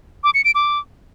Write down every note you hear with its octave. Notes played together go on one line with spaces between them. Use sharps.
D6
C#7
D7
D6